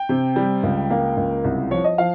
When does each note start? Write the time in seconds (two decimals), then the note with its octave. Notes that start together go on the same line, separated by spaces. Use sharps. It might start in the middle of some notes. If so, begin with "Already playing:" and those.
Already playing: G5
0.09 C3
0.36 G3
0.63 C#2
0.90 A#3
1.17 C#2
1.44 C2
1.71 F3 C#5
1.84 D#5
1.98 F3 F5